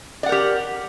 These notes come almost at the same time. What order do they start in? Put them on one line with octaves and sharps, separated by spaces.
D5 F#5 A#4 G4